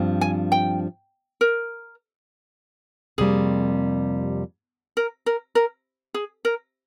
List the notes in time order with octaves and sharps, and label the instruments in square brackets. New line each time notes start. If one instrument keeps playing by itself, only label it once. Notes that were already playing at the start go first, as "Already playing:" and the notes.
Already playing: [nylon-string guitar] G2 F3 C4
[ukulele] G#5
G5
A#4
[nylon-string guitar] F2 C3 G3 A#3 [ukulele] G#4
[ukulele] A#4
A#4
A#4
G#4
A#4